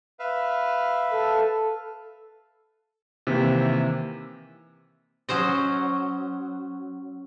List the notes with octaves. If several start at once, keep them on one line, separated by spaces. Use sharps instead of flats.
B4 E5 F5
A4
C3 D#3 E3 A#3 C4
F#3 C#4 C5 D#5